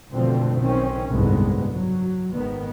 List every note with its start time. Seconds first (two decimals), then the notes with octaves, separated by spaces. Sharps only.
0.12 F#1 B2 D3 F3 A3 C4
0.59 B1 D#3 C4 C#4
1.10 F#1 C2 G#2 D3 G#3 B3
1.71 F#3
2.33 G#1 D#3 B3